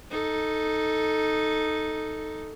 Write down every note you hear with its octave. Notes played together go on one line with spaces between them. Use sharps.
D#4 A4